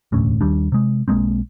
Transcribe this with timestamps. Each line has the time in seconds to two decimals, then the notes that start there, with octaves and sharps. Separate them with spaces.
0.12 E1 D2 A2 C#4
0.41 D#2 G3 D4
0.72 C3 G#3
1.08 B1 G#3 A#3 C4